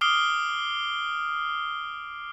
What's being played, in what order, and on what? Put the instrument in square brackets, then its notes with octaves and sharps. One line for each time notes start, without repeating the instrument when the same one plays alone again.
[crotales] D6 D#6 F6 C7 D7 G7